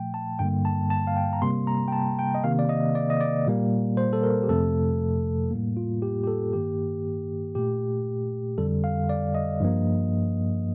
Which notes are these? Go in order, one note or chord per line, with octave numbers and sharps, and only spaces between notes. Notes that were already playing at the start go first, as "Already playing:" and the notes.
Already playing: A#2 F3 A3 G5
A5
G2 D3 G3 A#3 G5
A5
A5
F5
G5
A#5
C3 G3 A#3 C6
A#5
G5
A5
G5
D#5
C3 D#3 A#3 F5
D5
D#5
D5
D#5
D5
A#2 G3 A#3
C5
A4
A#4
G4
F2 C3 F3 A3 A4
A2 G3 A#3
F4
G4
G4
A4
G2 D#3 A#3 G4
A#2 A3 G4
F2 D3 G3 A4
F5
D5
D#5
G2 F3 A#3